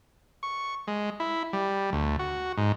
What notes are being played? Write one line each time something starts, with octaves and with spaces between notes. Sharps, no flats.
C#6
G#3
E4
G3
D2
F#4
G#2